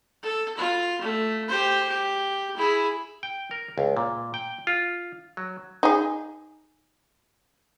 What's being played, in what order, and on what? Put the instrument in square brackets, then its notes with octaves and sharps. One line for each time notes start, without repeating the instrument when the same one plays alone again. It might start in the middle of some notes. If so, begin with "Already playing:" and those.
[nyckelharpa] A4
F4
A3
G4 C5
G4
E4 G#4
[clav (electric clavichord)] G5
A#4
C#2
A#2
G5
F4
F#3
[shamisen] D#4 G#4